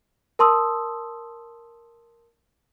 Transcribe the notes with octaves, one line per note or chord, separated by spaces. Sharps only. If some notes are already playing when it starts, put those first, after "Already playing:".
A#4 A5 C6 D#6 E6